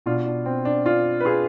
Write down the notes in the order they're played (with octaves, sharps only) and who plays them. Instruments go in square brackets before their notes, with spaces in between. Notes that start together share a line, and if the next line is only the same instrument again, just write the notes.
[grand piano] B2 D4 F4
D4
C4
D4
D4 F4
B4
F4 G#4